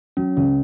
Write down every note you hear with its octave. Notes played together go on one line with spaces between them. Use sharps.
F#3 C#4
C#2 C#4